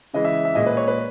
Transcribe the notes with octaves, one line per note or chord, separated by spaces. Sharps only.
C#3 E3 G#3 D#5
E5
E5
A#2 G#3 D#5
B4
C#5
B4